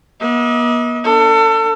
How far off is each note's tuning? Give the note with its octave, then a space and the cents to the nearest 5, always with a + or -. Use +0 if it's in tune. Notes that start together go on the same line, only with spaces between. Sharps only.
B3 -45 D#5 +40
D4 -10 A4 +30